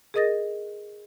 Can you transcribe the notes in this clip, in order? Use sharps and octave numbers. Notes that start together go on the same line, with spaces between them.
G#4 A#4 D#5 D#6 A6 A#6